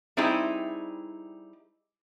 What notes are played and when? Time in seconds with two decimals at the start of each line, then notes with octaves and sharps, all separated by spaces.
0.17 G3 C4 D#4 E4 G#4